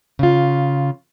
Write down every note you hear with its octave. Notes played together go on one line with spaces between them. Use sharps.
C#3 F4